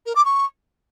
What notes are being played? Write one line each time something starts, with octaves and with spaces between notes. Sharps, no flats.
A#4
D6
C#6